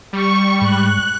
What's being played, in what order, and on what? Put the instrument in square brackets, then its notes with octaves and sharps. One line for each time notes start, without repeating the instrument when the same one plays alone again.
[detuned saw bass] G3 [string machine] C#6
[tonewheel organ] G#2 [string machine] F#6